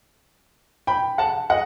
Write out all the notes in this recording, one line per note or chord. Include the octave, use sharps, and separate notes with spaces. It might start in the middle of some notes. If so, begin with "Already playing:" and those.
G5 B5
F#5 A5
D#5 F#5